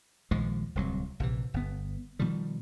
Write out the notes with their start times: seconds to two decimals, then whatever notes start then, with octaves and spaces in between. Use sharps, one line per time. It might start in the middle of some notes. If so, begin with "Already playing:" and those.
0.31 A#1 D#2 F3 G#3
0.75 D1 C2 F#3
1.20 A#1 C3 E3
1.54 G1 B3
2.19 B2 D#3 F3 G3